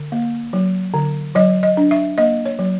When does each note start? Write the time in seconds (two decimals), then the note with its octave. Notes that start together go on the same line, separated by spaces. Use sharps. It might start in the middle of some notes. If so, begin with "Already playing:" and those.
Already playing: D3
0.12 A#3
0.53 F#3
0.94 D3
1.35 F#3 D#5
1.63 D#5
1.77 D4
1.91 E5
2.18 A#3 D#5
2.45 C#5
2.59 F#3